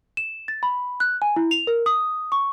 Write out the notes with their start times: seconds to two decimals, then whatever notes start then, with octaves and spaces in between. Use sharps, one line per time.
0.17 E7
0.48 A6
0.63 B5
1.00 F#6
1.22 G#5
1.36 E4
1.51 F7
1.67 A#4
1.86 D#6
2.32 C#6